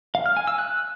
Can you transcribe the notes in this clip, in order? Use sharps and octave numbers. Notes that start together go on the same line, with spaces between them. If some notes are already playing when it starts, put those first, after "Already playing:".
F5
F6
G#5
E6
F#6